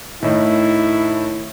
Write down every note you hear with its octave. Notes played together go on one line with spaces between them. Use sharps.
A2 D#3 E4